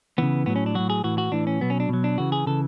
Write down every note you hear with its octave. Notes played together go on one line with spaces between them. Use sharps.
C#3 E3 B3
A2 F#3 B3
C#4
D4
A2 F#3 F#4
G#4
A2 E3 F#4
F#4
A2 E3 D4
C#4
B2 F#3 B3
C#4
D4
B2 F#3
D4
C#3 E3 F#4
G#4
C#3 E3 A4